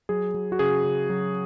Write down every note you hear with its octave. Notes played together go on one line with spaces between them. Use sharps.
F#3 G#4
F#3
F#4
C#3 G#4
C#3
F#3